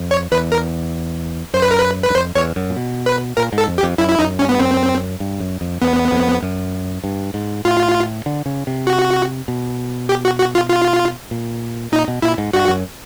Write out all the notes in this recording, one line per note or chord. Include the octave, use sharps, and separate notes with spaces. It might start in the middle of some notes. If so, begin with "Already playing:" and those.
Already playing: F2
C#5
E2 B4
A#4
F#2 C5
B4
A#4
B4
B4
F#2
F2 C5
E2 C#5
F#2
A#2
B2
B4
A#2 A#4
G#2
A4
F2
G4
F2
F#2 E4
E4
F#2 D#4
G2 C#4
B3
F#2 C4
G2
F#2
F2
E2 B3
F2
F#2
G2
G#2
A2 F4
D3
C#3
C3
F#4
B2
G4
F#4
F#4
F4
F4
A#2
A#2 D#4
B2
A#2 E4
G#2
G2 F#4
F#2